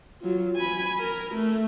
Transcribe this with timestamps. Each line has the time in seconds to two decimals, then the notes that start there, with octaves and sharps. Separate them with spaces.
0.21 F#3 F4
0.56 G#5 B5
0.99 A#4
1.35 A3